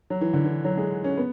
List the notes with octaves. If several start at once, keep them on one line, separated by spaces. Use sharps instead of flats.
F#3
E3
D3
E3
F#3
G#3
C#4
B3